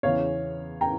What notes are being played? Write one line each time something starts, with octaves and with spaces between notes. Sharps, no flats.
E2 C#3 E3 C#5 F5
G5 A#5